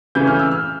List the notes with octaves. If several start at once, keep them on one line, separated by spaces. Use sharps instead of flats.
C#3 E3 A3 C#4 G6
F6
E6
F6